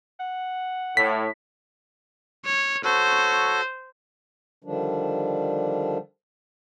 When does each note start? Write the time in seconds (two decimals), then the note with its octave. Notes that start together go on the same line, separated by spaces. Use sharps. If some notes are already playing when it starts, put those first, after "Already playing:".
0.20 F#5
0.97 A2 B6
2.45 C#5
2.84 F#4 A4 C5 C#5
4.64 D3 D#3 F3 G3 D4